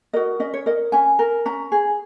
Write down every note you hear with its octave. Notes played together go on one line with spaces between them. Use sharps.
F#4 A#4 D#5
C#4 D#5
C#5
A#4 D#5
C#4 G#5
A#4
C#4 A#5
G#4